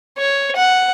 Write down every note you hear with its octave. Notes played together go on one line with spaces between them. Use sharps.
C#5
F#5